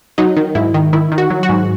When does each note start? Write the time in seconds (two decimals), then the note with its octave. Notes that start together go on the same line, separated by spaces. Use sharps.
0.18 F#3 D#4
0.36 D#3
0.55 G#2 E4
0.74 D#3
0.93 D#3 E4
1.12 D#3
1.18 F#4
1.30 F#3
1.43 F#4
1.49 G#2